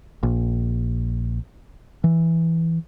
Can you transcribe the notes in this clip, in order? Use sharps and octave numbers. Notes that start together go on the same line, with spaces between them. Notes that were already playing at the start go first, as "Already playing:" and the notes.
A#1
E3